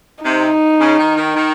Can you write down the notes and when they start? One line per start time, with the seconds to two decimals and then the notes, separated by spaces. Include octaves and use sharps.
0.25 C3 D#4
0.80 C#3
0.98 D#3
1.17 D#3
1.36 D#3